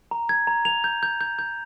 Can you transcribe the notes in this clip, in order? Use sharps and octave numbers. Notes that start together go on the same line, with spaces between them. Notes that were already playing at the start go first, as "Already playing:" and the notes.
A#5
G#6
A#5
F7
G6
G6
G6
G6